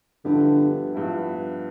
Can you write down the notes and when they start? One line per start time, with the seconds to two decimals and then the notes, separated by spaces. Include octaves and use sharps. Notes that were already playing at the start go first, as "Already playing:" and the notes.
0.25 G2 D3 F3 B3 E4 G4
0.93 G2 F3 B3 E4 G4